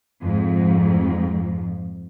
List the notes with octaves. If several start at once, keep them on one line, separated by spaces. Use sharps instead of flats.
F2 G#2